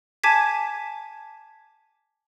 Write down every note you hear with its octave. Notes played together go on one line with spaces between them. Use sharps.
G#5 A5 D6 G#6 B6